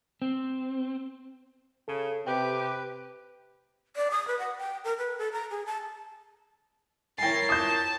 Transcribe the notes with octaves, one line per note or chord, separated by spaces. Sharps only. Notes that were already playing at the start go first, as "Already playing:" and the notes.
C4
C#3 A4
C3 G4 B4 G5
D5
D#6
B4
F#5
G5
A#4
B4
A4
A#5
G#4
A5
E4 A#4 C#5 G5 G#5 A6 C7
A5 D#6 G6